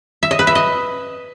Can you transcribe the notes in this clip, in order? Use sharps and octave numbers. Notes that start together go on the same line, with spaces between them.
E5
D#5
B4
E5
D#5